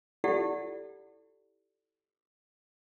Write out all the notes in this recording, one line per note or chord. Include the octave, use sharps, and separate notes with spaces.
E4 F4 G4 A4 D5 F#5